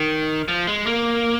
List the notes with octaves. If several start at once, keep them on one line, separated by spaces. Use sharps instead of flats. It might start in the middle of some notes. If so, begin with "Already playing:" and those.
Already playing: D#3
F3
G#3
A#3